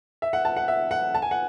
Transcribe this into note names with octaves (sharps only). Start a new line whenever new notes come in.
E5
F#5
A5
F#5
E5
F#5
A5
G#5
F#5